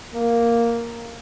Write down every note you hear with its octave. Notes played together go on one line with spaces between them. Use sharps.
A#3